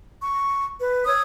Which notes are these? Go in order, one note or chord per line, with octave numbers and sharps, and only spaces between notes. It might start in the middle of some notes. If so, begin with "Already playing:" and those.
C#6
B4
C#5 D#6 E6